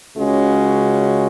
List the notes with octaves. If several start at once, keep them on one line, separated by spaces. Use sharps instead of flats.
C#2 C#3 G#3 C#4 F#4